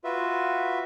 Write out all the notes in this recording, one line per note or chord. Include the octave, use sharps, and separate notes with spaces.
F4 F#4 B4 E5